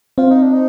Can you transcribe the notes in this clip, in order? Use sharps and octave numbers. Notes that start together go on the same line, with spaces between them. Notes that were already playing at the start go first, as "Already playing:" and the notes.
C4 F4 C5
D#4
D4
D#4